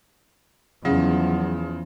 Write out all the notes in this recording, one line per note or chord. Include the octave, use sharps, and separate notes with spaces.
E2 C#3 F3 F#3